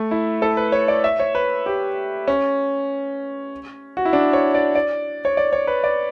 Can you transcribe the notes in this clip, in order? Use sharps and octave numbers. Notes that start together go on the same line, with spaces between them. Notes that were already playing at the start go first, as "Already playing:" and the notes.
Already playing: A3
E4
A4
B4
C#5
D5
E5
C#5
B4
G4
C#4
F#4
E4
D4
C#5
D5
D5
C#5
D5
C#5
B4
D5